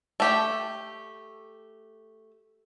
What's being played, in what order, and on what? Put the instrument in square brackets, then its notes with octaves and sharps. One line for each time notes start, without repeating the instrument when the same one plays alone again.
[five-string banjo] A3 G4